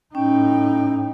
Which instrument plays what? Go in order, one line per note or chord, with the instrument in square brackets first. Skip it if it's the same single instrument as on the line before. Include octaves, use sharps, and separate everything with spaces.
[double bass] A2 D#4 [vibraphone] C#4 [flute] G5